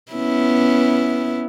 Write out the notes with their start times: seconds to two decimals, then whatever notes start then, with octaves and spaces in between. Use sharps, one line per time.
0.12 B3 C#4 E4